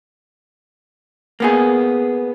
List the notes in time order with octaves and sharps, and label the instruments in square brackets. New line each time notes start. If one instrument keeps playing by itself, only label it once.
[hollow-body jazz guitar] A#3 B3 G#4